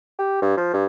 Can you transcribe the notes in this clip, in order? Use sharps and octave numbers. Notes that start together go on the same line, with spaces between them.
G4
G2
F3
G2